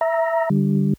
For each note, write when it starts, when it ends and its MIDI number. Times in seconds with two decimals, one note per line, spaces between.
0.01 0.49 76
0.01 0.49 82
0.50 0.93 50
0.50 0.93 55